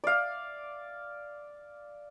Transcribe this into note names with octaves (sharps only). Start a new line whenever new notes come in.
D5 F5